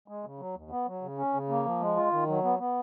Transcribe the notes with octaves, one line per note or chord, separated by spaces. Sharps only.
G#3
C#3
F#3
D#2
B3
F#3
C#3
C#4
C#3
A#3
F3
G#3
F4
D#3
F#3
B3
B3